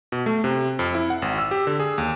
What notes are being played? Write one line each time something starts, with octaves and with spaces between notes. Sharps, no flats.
B2
A3
C3
F2
E4
F#5
G#1
E6
G4
D3
G#4
D#2